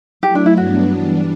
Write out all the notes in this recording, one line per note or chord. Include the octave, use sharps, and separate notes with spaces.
F#3 A3 E4 G4
D4
E4
G2 F#3 B3 D4 F#4
E3 G3 D4